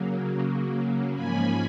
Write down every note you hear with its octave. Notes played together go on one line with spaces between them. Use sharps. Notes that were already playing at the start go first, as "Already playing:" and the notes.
Already playing: C#3 F#3 A#3
G#2 F3 A#3 C#4 G#5 B5